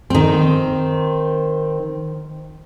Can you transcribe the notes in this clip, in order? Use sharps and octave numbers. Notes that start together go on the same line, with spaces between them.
D#3 C4